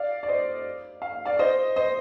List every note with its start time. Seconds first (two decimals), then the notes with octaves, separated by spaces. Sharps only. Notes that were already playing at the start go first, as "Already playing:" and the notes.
Already playing: D5 F5
0.23 D5
0.28 C5 D#5
1.02 F5
1.25 D5 F5
1.39 C5 D#5
1.76 C5 D#5